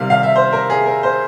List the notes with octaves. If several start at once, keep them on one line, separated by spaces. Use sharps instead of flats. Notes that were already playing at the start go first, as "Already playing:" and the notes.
Already playing: C3 D#3 G3 F5
F5
E5
C5
A#4
G#4
A#4
C5